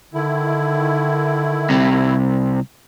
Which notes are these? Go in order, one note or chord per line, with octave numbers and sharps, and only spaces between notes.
D3 D#3 E4
C2 C3